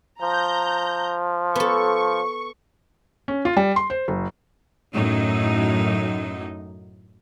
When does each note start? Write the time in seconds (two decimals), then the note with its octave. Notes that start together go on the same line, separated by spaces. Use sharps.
0.22 F3 A#5 G6
1.56 B3 A4 C#6
3.28 C#4
3.45 F4
3.57 G3
3.76 C6
3.90 C5
4.08 F#1
4.93 F#2 A2 F#3 D#4